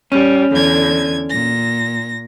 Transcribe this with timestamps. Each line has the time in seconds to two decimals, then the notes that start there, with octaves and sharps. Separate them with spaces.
0.12 G3 C#4
0.51 E2 D3 G#6
1.29 A#2 A#6